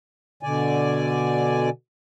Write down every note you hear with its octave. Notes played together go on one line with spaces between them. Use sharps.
B2 D3 D5 G#5